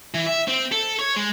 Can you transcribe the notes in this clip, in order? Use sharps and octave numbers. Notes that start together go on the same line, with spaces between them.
E3
E5
C4
A4
C#5
G#3